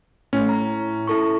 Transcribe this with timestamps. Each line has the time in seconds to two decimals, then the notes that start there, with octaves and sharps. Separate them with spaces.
0.33 A2 C#4
0.49 A#5
1.07 E4 A4 C#6